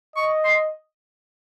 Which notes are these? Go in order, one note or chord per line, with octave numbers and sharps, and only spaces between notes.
D#5 C#6
C6